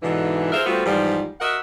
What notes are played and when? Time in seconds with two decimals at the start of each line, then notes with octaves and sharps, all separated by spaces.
0.02 G#2 B2 D3 E3
0.52 F4 G#4 A#4 C5 E5
0.66 G3 A3 B3 C4 F4 F#4
0.85 G#2 E3 F3 G3
1.40 F#4 A#4 D#5 E5 F#5